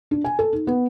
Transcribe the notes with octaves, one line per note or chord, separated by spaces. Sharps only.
D4
G#5
A4
D#4
B3